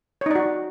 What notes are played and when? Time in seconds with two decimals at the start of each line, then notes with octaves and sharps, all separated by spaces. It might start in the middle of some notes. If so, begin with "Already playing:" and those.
0.21 C#5
0.26 D#4
0.31 D5
0.35 F#4